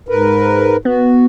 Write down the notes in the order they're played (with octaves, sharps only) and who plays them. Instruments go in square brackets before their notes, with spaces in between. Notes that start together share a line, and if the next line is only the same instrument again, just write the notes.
[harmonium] G#2 A#4 B4
[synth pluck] B3 [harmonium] F#4